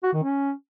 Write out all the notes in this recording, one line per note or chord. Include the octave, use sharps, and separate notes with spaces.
F#4
D#3
C#4